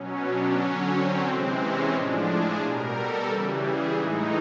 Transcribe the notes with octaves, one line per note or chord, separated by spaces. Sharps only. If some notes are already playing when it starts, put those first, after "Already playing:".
Already playing: B2 F#3 C#4
D4
D3 F#3 C#4
C4
C3 E3 G#3
C#4
A2 F3 G#3 D4
G#4
B2 G3 A#4
A4
C#3 E3 G3
G#4
A2 E3 G#3 D#4